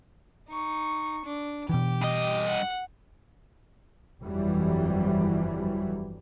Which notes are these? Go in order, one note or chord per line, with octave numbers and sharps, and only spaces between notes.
D#4 C#6
D4
B2 E3 G4
G2 D#5
F#5
G1 F2 E3 F#3 G3